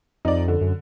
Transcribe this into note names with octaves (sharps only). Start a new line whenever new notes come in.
F2 D#4 D5
D3
F#2